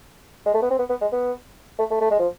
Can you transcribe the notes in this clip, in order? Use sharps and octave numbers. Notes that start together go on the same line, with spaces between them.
G#3
A3
B3
C4
B3
B3
G#3
B3
A3
A3
A3
G#3
F3